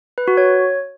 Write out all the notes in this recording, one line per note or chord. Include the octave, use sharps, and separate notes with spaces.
B4
F#4
C#5